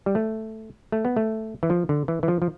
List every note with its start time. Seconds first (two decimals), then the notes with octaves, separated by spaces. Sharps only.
0.06 G3
0.15 A3
0.92 A3
1.05 B3
1.16 A3
1.63 E3
1.70 F3
1.89 D3
2.08 E3
2.23 E3
2.28 F3
2.42 F3